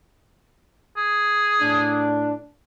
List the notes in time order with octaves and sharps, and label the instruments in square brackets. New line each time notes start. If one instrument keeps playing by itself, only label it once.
[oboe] G#4
[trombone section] A2 D4